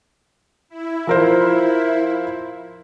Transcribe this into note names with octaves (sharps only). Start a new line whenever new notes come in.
E4
F3 A#4 C5